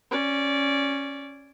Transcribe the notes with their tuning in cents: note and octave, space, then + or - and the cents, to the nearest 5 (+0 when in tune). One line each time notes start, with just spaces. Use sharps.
C#4 -5 D5 -15